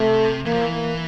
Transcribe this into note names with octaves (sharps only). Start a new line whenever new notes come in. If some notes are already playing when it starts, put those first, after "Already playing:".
Already playing: C3 A3
E3 A#3
F3
E3
A#3